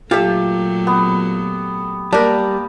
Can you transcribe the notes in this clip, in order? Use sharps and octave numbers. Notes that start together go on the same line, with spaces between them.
A#2 F#3 A3 F4 G4 A4 E5
B3
G3 A#3 D4 G4 A#4